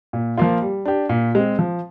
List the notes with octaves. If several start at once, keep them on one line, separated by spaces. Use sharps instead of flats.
A#2
F3 A#3 F4
G3
D4 G4
A#2
G#3 C4
F3